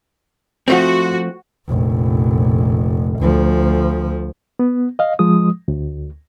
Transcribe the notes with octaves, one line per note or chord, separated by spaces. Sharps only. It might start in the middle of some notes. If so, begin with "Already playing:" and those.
F3 A3 C4 F#4
F1 A#1
D2 F3
B3
D#5 F5
F3 G#3 D#6
D2